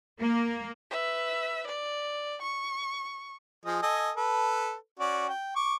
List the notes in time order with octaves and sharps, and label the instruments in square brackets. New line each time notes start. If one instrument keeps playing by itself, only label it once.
[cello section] A#3
[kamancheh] B4 E5
D5
C#6
[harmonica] F3 G#4 D#5
A4 D#5 G#5
A4 B4
C#4 F#4 D5
G5
C#6 D6